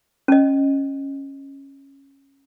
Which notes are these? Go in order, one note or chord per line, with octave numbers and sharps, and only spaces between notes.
C#4 D#5